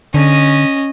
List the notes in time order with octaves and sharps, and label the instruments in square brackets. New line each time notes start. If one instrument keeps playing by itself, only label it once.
[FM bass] D3 [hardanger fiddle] C#4 D#5